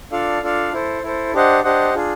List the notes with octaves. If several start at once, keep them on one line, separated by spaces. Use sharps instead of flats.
D4 F4 A4 D5 F5
D4 F4 A4 D5 F5
E4 A4 C5
E4 A4 C5
D4 G4 C5 D#5 F#5
D4 G4 C5 D#5 F#5
D4 F4 G#4